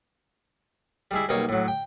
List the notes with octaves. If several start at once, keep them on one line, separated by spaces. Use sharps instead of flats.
G3 G#3 E4
B1 G3 A#3 D#4 C#5
A2 F#3
G5